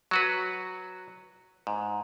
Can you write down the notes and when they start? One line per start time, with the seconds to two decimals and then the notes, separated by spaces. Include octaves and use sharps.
0.11 F#3 F#4 B4
1.67 G#2